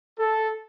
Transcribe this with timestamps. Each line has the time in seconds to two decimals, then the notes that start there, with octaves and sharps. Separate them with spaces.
0.18 A4